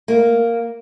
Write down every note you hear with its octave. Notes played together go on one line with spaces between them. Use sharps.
A#3